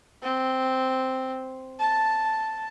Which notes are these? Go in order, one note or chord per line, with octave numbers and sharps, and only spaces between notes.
C4
A5